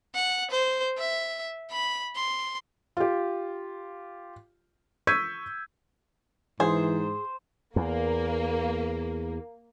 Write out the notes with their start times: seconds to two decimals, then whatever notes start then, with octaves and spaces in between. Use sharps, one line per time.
0.15 F#5
0.51 C5
0.98 E5
1.71 B5
2.16 C6
2.97 F4 G4
5.07 C#6 E6 G6 G#6 B6 D#7
6.60 G#2 E3 G#4 C5
7.76 E2 A#3